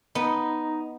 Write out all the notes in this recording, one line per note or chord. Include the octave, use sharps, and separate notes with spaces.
B3 D#4